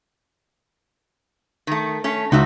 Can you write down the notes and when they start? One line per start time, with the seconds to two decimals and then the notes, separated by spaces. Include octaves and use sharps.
1.67 D#3 A3
2.04 A3 C#4
2.32 C#2 D#4 F#4 E5